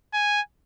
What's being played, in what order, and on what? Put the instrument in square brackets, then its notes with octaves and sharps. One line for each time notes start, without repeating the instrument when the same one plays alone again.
[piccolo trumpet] G#5